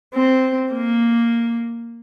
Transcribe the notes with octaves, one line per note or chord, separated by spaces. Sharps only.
C4
A#3